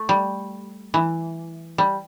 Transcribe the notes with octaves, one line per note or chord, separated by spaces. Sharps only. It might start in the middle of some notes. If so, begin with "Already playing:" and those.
Already playing: A3
G3
E3
G3